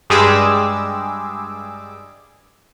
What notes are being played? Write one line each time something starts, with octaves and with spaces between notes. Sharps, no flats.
G2 G3 G#3 G#4 D6 E6